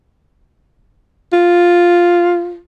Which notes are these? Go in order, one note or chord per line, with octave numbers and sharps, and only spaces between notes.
F4